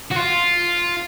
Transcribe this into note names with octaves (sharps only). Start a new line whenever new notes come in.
F#4
F4